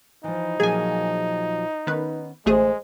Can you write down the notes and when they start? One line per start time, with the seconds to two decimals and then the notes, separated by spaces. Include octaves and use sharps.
0.24 E3 F3 D#4
0.60 A#2 F3 F#3 G#4 G#5
1.87 D#3 B3 C#4 B4
2.46 A1 D2 G#3 A3 G#4 C5